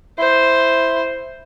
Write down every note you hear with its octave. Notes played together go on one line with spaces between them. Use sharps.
E4 C5